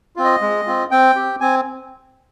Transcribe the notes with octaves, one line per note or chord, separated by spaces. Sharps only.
C4 F4
D#5
G#3
C4 F4
C4 G5
G4
C4 G#5